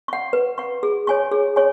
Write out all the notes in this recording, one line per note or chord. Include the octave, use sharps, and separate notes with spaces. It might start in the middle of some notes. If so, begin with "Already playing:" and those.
F#5 C#6
B4
F#5 C#6
G#4
C#5 G#5 C#6
G#4
C#5 G#5 C#6